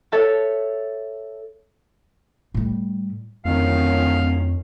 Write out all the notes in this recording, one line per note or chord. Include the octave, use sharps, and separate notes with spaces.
A4 C#5 E5 A5
A2 G3
D1 F2 D#3 F3 C#4 F5